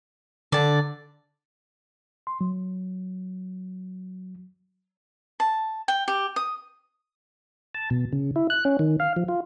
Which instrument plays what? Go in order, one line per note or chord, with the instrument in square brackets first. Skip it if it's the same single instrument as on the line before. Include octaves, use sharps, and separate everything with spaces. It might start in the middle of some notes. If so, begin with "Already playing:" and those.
[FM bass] D3 [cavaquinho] D5 A5
[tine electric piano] C6
F#3
[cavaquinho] A5
G5
G4
D#6
[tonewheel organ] A5
B2
C#3
E4
F#6
C#4
D#3
F5
F3
F4